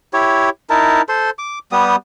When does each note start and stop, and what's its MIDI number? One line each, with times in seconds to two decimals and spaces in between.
0.13 0.50 64
0.13 0.50 67
0.13 0.50 73
0.70 1.02 63
0.70 1.02 64
0.70 1.02 70
0.70 1.02 81
1.09 1.30 69
1.09 1.30 72
1.09 1.30 84
1.39 1.59 86
1.72 1.96 55
1.72 1.96 59
1.72 1.96 67
1.72 1.96 87